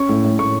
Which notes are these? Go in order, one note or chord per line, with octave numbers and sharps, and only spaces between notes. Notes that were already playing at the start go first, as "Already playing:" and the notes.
Already playing: C#4 C#6
A2
A2
A2 C#6